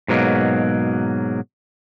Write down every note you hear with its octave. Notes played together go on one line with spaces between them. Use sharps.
G#2 B2 F#3 A#3